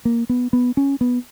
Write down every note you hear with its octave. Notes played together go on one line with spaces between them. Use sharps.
A#3
B3
B3
C#4
B3